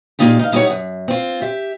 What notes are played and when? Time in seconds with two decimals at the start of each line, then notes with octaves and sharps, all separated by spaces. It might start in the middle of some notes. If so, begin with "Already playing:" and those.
0.19 A#2 E3 A#3 D#4 F4 G4
0.39 D#4 F5
0.52 G3 D#4 E4 C5 C#5 F#5
0.70 F#2
1.08 C4 F4
1.42 G4 E5